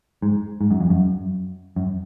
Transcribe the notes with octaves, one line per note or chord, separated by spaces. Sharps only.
G#2
G#2
F#2
F2
F#2
F#2